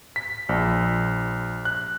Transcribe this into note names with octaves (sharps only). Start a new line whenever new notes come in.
B6
A#1
F#6